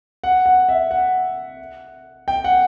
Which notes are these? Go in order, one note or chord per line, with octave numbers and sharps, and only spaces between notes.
F#5
F#5
E5
F#5
G5
F#5